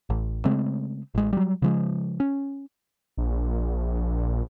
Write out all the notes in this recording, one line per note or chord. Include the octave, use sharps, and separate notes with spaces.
A1
C#3 G#3 A3 C4
A1 G#3
F#3 G3
C#3 F3 G#3
C#4
A#1